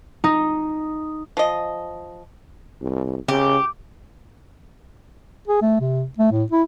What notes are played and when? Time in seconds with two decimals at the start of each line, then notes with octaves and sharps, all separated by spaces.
0.24 D#4
1.37 F3 D#5
2.81 C2
3.28 C#3 G4
5.47 G#4
5.62 A3
5.81 C3
6.18 A3
6.32 A2
6.52 E4